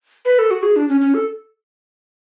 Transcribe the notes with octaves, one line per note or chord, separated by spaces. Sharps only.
B4
A4
F#4
G#4
D4
C#4
C#4
A4